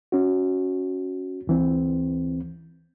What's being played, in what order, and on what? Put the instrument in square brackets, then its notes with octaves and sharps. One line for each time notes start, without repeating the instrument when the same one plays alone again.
[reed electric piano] C#4 F#4
D2 E3 C4